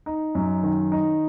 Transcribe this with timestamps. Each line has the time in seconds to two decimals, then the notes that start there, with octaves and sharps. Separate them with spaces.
0.06 D#4
0.35 F#2
0.63 D#3
0.92 D#4